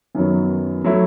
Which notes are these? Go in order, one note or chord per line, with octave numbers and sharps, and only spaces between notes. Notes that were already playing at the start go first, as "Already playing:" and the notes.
F#2 D#3 F#3 B3
F#3 A3 E4